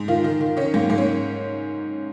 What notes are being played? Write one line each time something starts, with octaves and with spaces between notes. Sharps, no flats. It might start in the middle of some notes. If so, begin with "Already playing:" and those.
Already playing: G#2
D#3 F4
D#3
D#3
D#3 C#4
G#2 A#3
G#2 A#3
C#4